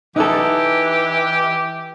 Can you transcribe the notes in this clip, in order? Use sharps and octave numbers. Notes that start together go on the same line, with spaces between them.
E3 D#4 G4 A4